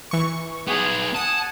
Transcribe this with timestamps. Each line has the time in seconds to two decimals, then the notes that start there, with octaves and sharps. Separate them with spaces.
0.11 E3 C#6
0.67 B3 D#4 G#4
1.15 F#5 G#5 A5 D#6